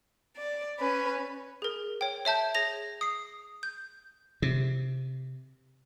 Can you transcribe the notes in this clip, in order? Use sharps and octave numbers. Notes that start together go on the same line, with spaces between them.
D5
C#4 B4
G#4 A#4
C#5 G5
C#5 E5 A5 G6
G#4 C#5 A#6 F7
D#6 C7
G6
C3